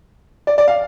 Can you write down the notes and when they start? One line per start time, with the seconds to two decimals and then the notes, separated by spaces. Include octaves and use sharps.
0.47 D5
0.58 D5
0.68 F5